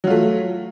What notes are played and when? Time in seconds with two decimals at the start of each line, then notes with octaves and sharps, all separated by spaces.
0.04 F#3
0.07 F4
0.10 A3